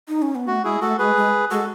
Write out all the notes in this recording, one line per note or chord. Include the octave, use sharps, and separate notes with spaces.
D#4
C#4
B3
A3 F#4
G#3 E4 G#4
A3 F#4 A4
G#3 G#4 B4
G#3
G#3 F#4 A4